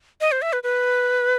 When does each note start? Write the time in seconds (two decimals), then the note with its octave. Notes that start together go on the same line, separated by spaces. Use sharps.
0.21 D#5
0.32 C5
0.42 E5
0.53 B4
0.63 B4